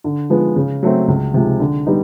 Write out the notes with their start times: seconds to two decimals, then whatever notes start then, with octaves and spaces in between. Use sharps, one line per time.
0.04 D3
0.30 F3 G#3 B3
0.56 C#3
0.83 F#3 A3 C4
1.08 C#2
1.34 C3 F3 G#3
1.60 D3
1.86 G3 B3 D#4